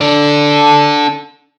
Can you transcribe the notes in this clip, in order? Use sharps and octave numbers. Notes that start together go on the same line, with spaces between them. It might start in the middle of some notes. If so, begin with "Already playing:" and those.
D4 A4